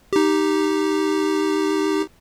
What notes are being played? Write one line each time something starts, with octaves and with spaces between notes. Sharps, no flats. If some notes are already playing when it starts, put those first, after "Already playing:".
D#4 G4